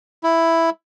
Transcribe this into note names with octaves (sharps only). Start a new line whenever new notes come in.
E4